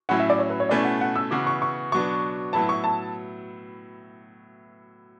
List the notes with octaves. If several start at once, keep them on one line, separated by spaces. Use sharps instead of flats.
A2 F#3 C#4 E4 F#5
E5
D5
C#5
B4
C#5
B2 A3 C#4 E4 D5
F#5
F#5
E6
C#3 E3 B3 F#4 D6
C#6
C#6
B2 F#3 B3 D4 C#6
A2 F#3 B3 E4 A5
C#6
A5